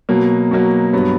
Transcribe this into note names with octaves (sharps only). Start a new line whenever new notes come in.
B2 F#3 A#3
B2 F#3 A#3
G2 F#3 B3